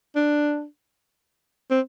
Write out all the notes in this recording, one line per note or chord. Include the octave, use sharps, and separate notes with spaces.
D4
C4